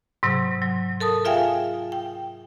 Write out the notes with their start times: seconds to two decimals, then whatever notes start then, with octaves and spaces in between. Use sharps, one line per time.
0.23 G#2 C3 F#3
0.62 F#3
1.00 A4 A#4 A5 D#6
1.25 F4 G#4 E5 F5 G5 G#5
1.92 G5